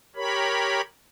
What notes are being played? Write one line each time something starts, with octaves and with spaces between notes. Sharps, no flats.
G4 A#4 C#5 B5